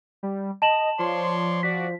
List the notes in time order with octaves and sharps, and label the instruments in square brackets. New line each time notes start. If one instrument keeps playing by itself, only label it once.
[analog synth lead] G3
[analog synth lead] D#5 [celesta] A5 E7 F#7
[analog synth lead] F3 [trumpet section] C#5 D5 C6
[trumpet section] F#4 D5 [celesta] B6